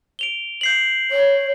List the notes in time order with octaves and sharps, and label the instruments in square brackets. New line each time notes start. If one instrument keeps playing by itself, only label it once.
[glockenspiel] D7 F7 G7
G6 C7 F#7
[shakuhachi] C#5